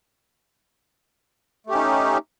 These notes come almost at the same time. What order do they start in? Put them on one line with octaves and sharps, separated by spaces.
A3 G4 C#4 D#4